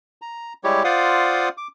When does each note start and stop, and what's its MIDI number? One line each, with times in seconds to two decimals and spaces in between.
0.22 0.53 82
0.64 0.83 55
0.64 0.83 56
0.64 0.83 64
0.64 0.83 67
0.64 0.83 73
0.84 1.49 65
0.84 1.49 72
0.84 1.49 74
0.84 1.49 77
0.84 1.49 78
0.84 1.49 87
1.57 1.68 86